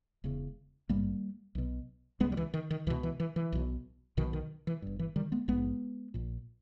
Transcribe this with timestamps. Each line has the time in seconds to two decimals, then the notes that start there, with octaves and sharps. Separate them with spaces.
0.24 E1 E2 C#3
0.89 G#1 G2 G3 A#3
1.55 B1 B2
2.20 C#2 G#3 B3
2.24 C#3
2.32 G3
2.37 E3
2.54 D#3
2.70 D#3
2.87 C#2 E3
2.90 B2
3.03 E3
3.20 E3
3.36 E3
3.52 B1 B2
4.17 B1 B2 D#3
4.33 D#3
4.67 E3
4.82 G1 G2
4.99 E3
5.16 D#3 G3
5.32 G#3 B3
5.48 A#1 G#2 G#3 B3
6.14 A#1 A#2